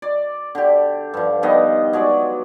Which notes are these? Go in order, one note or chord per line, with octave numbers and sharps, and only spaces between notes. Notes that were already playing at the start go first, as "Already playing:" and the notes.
D5
D3 G4
G2 F3
G2 D#3 B3 D#5
F#3 G#3 D5